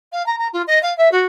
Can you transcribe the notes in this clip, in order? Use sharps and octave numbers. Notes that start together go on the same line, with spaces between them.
F5
A#5
A#5
F4
D#5
F5
E5
F#4